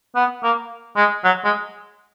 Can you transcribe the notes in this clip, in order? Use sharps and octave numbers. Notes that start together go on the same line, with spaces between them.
B3
A#3
G#3
F#3
G#3